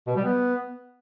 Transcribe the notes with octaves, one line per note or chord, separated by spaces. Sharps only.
B2
G3
B3